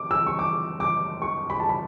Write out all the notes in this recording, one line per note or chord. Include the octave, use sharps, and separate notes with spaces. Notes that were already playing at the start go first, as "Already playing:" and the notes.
Already playing: D6
E6
C#6
D6
D6
C#6
B5
A5
B5